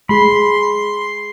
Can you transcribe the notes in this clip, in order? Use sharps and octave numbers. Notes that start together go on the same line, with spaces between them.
G#3 G#4 B5 C6